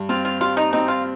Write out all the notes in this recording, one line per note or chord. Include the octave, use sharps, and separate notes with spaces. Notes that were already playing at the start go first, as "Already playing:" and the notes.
Already playing: G2
C4 F4
F4
G3 F4
D#4
C4 D#4
F4